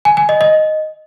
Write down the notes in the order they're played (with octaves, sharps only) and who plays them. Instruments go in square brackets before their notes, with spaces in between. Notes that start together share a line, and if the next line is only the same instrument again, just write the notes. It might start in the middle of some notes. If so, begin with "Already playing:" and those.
[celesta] G#5
G#5
D#5
D#5